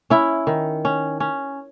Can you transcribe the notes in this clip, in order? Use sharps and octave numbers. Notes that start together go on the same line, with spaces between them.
C#4 E4
D#3
C#4
C#4